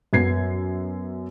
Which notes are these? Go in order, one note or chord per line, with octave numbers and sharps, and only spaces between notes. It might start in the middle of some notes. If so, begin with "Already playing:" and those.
F#2 B3 G#6 C7